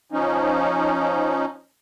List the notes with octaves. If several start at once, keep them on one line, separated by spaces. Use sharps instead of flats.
F3 C#4 D#4